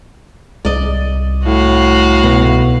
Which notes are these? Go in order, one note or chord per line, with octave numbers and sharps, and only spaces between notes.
C2 D5 D#5
A2 F#4 F5
B2